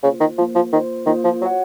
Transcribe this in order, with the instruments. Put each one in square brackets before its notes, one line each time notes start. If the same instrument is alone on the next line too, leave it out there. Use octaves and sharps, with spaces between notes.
[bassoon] C#3 [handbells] A#3 F4 C5
[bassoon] D#3
[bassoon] F3 [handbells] A#3 F4 C5
[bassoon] F3
[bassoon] D#3 [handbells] A#3 F4 C5
[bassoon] D#3 [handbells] A#3 F4 C5
[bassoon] F3
[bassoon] F#3 [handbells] F#4 C#5 F#5